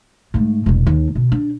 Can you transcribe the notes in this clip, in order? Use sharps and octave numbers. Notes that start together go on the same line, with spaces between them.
G#2 A3
E1 C2
D#2
B2
D4